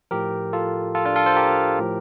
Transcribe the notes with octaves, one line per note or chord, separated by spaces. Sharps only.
A2 F3 G4 A#4
F4 A4
F4 A4
D4 F4
F4 A4
A4 C5
G4 A#4
A2 F3